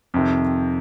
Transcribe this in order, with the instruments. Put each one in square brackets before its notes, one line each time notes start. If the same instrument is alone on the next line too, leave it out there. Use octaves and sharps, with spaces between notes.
[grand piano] F2 C3 D#3